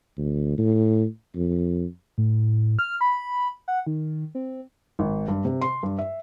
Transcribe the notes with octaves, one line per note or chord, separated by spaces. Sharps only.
D2
A2
F2
A2
F6
B5
F#5
D#3
C4
G#1
G2
C3
C6
G2
E5